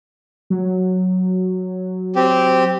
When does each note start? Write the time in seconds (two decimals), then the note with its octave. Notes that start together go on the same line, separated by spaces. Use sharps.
0.50 F#3
2.16 C4 G4